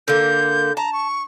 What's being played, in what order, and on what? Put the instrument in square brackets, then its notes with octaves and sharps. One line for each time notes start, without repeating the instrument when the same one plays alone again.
[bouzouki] D3 A#3 [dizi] G6
[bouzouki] A5 [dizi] A#5
[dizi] C#6